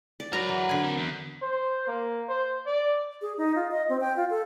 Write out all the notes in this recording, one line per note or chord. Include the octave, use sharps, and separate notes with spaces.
D5
F#3 A#4 B4 F#5 A#5
E3
D3 G#5
C4 A#4
E2
C5
A#3
C5
D5
G#4
D#4
F4
D#5
C4
G5
F4
A4